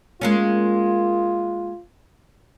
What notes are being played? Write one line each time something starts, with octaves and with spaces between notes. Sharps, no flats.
G#3 A#3 C#4 F4